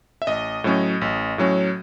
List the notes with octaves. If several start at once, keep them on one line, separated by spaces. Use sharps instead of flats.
E5
A1 D#5
A2 F#3 C#4
A1
A2 F#3 C#4